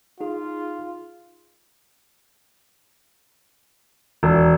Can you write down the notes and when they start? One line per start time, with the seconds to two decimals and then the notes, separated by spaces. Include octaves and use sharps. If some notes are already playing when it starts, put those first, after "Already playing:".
0.21 D#4 F4 G#4
4.23 E1